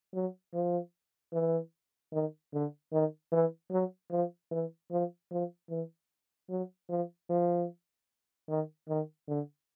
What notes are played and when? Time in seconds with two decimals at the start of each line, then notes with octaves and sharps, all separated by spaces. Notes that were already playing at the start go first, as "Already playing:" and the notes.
0.14 F#3
0.54 F3
1.33 E3
2.12 D#3
2.53 D3
2.92 D#3
3.32 E3
3.71 F#3
4.11 F3
4.51 E3
4.91 F3
5.31 F3
5.70 E3
6.50 F#3
6.89 F3
7.29 F3
8.49 D#3
8.89 D#3
9.28 D3